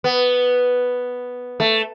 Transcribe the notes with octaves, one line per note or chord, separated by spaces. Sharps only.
B3
A3